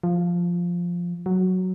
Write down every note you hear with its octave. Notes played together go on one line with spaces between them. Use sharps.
F3
F#3